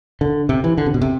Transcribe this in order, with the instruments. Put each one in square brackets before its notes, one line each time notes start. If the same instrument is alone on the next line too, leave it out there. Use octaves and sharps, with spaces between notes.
[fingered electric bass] D3
C3
E3
D3
C3
B2
C3